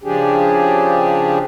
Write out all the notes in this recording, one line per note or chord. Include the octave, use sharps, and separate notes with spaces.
C#3 F3 D4 G4 G#4